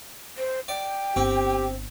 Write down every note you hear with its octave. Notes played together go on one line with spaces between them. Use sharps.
C5
D5 G5
G1 C4 G4